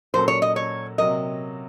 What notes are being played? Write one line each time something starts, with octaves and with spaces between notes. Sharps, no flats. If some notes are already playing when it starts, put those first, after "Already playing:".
A#2 F#3 A#3 C#4 A4 C5
C#5
D#5
C#5
C3 F#3 A#3 D#5